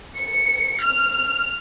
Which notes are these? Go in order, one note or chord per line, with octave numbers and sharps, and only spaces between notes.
C#7
F6